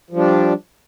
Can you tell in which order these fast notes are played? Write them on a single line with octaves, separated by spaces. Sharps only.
F3 G3 D4